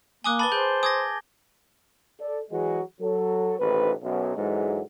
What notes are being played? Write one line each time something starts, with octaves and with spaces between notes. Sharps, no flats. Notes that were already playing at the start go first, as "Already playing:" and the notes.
A#3 G#5 D6 D#6 F#6 G7
B4 A5 B5 A6 G7
G#4 C5 G#5 G6
G#5 D6 D#6 G#6 A#6
A4 D5
E3 F#3 G#3 F#4 G#4
F#3 A4
A1 F2 G#2 C3 D#3 B4
B1 F#2
G#2 D3 E3 F#3 G#3